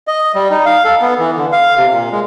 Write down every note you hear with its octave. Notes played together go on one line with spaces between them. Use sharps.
D#5
G3
D#4
F5
A4
B3
E3
D3
F5
C3
A#2
G#3